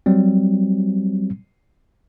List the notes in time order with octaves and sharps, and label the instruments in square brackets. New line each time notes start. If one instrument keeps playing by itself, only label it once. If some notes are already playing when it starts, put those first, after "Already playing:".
[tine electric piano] F#3 G3 C4